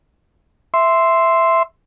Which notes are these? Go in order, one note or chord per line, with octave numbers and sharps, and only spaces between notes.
E5 C6